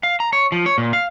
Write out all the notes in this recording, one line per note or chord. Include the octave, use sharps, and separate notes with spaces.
F5
A#5
C#5
F3
C#5
A#2
F5